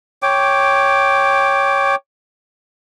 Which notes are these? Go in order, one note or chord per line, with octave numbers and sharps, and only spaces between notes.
C#5 G5 D6